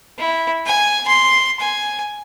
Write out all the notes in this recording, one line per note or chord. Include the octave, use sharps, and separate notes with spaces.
E4
G#5
C6
G#5